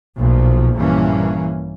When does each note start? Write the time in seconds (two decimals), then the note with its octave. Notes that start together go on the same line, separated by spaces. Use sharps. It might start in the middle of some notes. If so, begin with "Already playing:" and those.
0.16 B1 A#2 F3
0.75 A#1 G2 A#2 E3 A#3 C#4